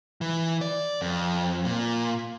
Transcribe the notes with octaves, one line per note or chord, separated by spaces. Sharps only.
E3
D5
F2
A#2